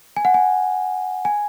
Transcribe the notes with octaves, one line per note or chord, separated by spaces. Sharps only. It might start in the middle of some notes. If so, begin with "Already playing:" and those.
G#5
F#5
G#5
G#5